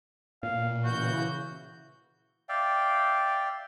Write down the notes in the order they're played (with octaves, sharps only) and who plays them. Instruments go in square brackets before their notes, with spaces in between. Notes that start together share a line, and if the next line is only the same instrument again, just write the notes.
[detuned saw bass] A#2 [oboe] F5
[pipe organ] C#3 E3 G6 [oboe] F#4
[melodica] D5 E5 F5 G5